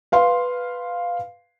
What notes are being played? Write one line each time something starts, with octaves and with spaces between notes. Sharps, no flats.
B4 F5 C6